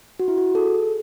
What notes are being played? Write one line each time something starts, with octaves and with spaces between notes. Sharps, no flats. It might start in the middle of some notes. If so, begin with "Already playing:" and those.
F#4
E4
F#4
A4
G#4